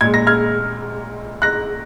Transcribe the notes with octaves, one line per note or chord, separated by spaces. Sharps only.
A#2 G#3 G#6
A#6
F6 G#6
F#6 A#6